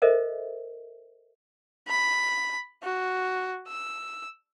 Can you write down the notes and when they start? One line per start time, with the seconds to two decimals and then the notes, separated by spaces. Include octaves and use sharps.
0.02 A4 A#4 C5 D#5 E5
1.88 B5
2.83 F#4
3.68 E6